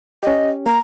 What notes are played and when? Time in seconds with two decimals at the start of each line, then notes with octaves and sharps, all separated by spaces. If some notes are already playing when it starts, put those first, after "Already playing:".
0.23 C#4 G4 D#5
0.66 A#3 A#5